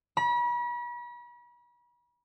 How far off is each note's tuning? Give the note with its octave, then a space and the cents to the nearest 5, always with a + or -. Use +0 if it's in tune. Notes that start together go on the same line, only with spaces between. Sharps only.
B5 -40